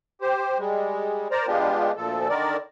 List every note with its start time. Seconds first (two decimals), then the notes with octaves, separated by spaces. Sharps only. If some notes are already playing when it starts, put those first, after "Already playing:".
0.21 G4 C5
0.59 G3 G#3
1.31 A#4 C5 D5 A#5
1.47 G#3 B3 D4 F4 G4
1.96 D2 A#2 F3 A4
2.29 D3 D#3 A#4 D5